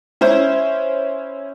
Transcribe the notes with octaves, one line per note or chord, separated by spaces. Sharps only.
C#4 E4 C5